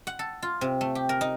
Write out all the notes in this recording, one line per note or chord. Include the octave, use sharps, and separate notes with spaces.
F#5
A4
F4
C3
A3
G4
A#4
D#4